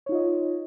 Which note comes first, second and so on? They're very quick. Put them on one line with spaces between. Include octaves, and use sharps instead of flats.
C#5 D#4 F4 D#5